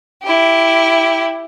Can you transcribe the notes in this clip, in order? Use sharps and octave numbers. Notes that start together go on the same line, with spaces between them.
E4 G4